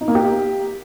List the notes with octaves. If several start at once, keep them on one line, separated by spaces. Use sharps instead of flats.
D#4
A#3
G4